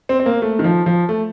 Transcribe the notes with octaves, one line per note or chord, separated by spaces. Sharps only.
C4
C4
A#3
A3
D#3
F3
F3
A3